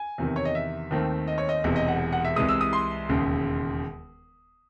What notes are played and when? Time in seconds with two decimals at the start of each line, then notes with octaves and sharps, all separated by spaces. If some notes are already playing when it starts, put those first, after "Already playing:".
Already playing: G#5
0.18 E2 C3 D#3
0.36 C#5
0.45 D#5
0.55 E5
0.91 D#2 D#3 A3 C4
1.28 D#5
1.38 C#5
1.49 D#5
1.64 E1 E2 C3
1.76 D#5
1.88 F#5
2.13 F#5
2.25 E5
2.36 C2 C3 E3 G#3 D#6
2.49 E6
2.61 D#6
2.73 C6
3.09 E1 D#2 C#3